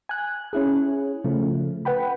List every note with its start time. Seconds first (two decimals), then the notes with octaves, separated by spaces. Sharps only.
0.09 G#5 F#6
0.53 C#4 E4 G#4
1.24 C#3 F3 A3
1.85 B4 F#5 G5 B5